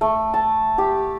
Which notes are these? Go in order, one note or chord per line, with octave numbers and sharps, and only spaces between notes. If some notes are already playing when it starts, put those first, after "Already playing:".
A3
A5
G4